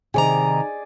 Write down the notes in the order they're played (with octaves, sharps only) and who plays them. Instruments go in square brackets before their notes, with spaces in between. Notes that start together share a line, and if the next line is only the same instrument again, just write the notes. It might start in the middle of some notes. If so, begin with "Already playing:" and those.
[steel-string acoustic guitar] C3 D#3 A#5 [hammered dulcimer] G#4 D5 D#5